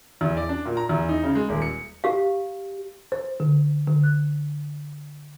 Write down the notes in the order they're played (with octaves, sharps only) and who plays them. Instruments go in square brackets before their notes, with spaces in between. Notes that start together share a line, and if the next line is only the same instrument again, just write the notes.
[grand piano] E2
D5
D4
A#2
A#5
E2
D#4
C#3
G#3
D#1
C#7
[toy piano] G4 F5
[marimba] C5
D3
D3
F#6